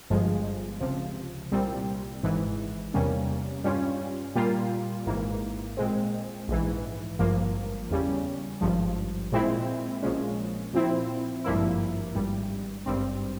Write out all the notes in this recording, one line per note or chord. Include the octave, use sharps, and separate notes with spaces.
G1 G2 F3 G#3
C#2 C3 F3
C2 A#2 G3 C4
G#1 G#2 E3
E2 C3 G3 A#3 C#4
G2 G3 C#4 F4
A#2 G3 A#3 F4
G#1 G#2 E3 A#3
A#2 G#3 C4
A#1 G#2 E3
G#1 G2 F3 A#3
E2 C#3 G3 C#4
G#1 G2 F3
A#2 G#3 C4 E4
A#1 A#2 F3 G#3 C#4
A#2 F3 C4 E4
G#1 G2 F3 A#3 E4
G#1 G2 G3
G#1 G2 G3 C4